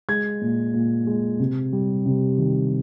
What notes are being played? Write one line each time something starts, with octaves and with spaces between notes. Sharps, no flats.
G#3 G#6
A#2
A#2
G#3
C3
G3
C3
D#3